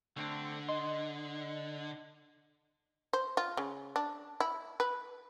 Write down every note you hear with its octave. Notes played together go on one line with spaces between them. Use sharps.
D3 A3 C4 D4
D#5 C6
C5
F4
C#3
D4
E4
B4